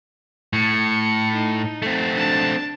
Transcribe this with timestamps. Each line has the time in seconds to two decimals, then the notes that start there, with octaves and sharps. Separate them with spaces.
0.53 A2 C#7
1.35 D#4
1.82 A3 C4
2.15 D4 A5